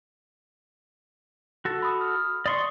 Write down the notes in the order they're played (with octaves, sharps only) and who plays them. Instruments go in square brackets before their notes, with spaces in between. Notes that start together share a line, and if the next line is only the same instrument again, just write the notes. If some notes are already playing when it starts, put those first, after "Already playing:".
[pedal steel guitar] F#4 A4
[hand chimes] B5 D#6
F6
[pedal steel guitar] D5 C6 C#6 [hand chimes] D#6 A6